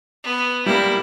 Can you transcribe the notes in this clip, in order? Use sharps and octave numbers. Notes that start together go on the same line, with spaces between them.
B3
G3 A#3 E4